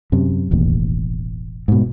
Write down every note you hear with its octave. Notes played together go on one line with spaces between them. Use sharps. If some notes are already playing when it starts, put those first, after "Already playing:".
F#2 C3
E1 A1 D#2
G#2 B2